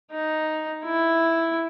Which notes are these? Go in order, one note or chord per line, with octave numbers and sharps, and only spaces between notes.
D#4
E4